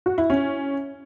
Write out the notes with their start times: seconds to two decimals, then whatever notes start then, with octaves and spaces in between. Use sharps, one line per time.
0.06 F#4
0.18 E4
0.30 C#4